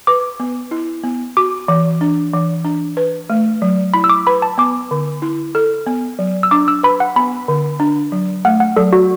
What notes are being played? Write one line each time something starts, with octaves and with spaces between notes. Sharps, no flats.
B4 D6
B3
E4
B3
F#4 D6
E3
D4
E3
D4
B4
A3
F#3
E4 B5
E6
D6
B4 B5
A5
B3 D6
D3
E4
A4
B3
F#3
E6
D4 D6
E6
B4 B5
F#5
B3 B5
D3
D4
F#3
A3 F#5
F#5
F#3 A4
F#4